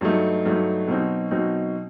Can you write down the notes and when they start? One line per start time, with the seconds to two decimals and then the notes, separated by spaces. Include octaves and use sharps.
0.01 G2 F#3 A3 D#4
0.45 G2 F#3 A3 D#4
0.88 B2 F#3 C4 D#4
1.31 B2 F#3 C4 D#4